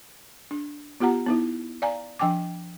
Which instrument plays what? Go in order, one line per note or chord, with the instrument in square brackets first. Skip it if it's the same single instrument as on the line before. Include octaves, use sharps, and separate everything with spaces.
[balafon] D4
B3 F4 G4 F#5 A#5
B3 D#4 E4
D5 F5 G#5 A#5
F3 D4 G5 G#5 D6